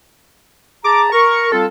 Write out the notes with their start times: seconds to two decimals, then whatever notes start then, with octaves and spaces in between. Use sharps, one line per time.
0.84 G#4 A5 A#5 D6
1.12 A#4 C#6
1.52 G3 C4 F4 A4